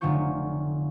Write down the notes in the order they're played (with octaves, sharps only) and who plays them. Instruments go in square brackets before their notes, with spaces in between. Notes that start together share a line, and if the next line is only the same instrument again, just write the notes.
[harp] F1 D3 F#3 F4 C#6 G6